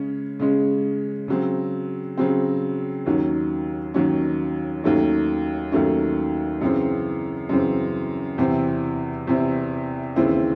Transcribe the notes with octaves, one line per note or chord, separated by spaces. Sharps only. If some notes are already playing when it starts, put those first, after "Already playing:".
Already playing: C#3 G#3 C#4
C#3 G#3 C#4
C#3 F#3 C4
C#3 F#3 C4
D#2 D#3 F#3 C#4
D#2 D#3 F#3 C#4
D#2 D#3 F#3 A3 C#4
D#2 D#3 F#3 A3 C#4
F#2 C#3 E3 C4
F#2 C#3 E3 C4
E2 C3 E3 C4 E4
E2 C3 E3 C4 E4
D#2 C#3 E3 C4 E4